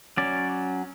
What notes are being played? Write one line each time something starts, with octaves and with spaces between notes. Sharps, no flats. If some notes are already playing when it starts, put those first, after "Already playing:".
F#3 C#4 D5